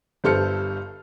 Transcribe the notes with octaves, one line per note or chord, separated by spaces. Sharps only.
G1 G2 A4 C5 F6 C#7